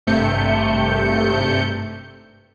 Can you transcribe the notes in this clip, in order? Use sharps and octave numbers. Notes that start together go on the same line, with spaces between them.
G#1 G2 C3 A3 G6 C#7